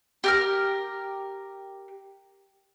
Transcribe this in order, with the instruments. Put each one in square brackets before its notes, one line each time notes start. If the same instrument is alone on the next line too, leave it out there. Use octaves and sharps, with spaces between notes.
[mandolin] G4 A#4 F6